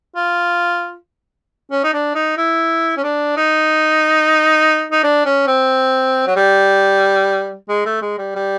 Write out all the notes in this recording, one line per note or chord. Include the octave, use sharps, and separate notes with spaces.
F4
C#4
D#4
D4
D#4
E4
C#4
D4
D#4
D#4
D4
C#4
C4
F#3
G3
G#3
A3
G#3
G3
G3